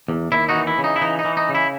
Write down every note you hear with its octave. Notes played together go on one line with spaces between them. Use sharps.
E2
D#2 E4
D#4 F#4
E3
E4
C#3
D#4
E4
E3 D#4
D#4
E3
D#4
C#3
E4